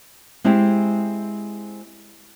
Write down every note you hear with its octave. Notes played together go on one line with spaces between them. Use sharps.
G#3 C4 E4 G4 G#4